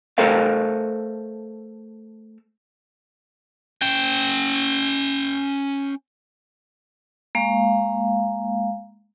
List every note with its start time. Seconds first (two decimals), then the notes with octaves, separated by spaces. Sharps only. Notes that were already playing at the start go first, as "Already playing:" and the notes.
0.18 A3 A4 A#4 C5 F5
3.82 C#4 G5
7.35 G#3 A#3 F5